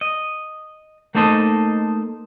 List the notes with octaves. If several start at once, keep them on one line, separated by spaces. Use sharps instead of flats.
D#5
A3 A#3 D#4 A4 C5 D#5